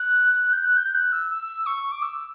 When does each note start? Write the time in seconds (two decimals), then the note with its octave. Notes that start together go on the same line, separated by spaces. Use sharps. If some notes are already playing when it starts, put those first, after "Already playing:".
Already playing: F#6
0.53 G6
0.58 F#6
0.77 G6
0.95 F#6
1.12 E6
1.31 E6
1.66 C#6
1.92 D6
2.02 E6